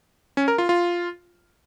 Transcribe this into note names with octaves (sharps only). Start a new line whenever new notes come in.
C#4
A#4
F4
F4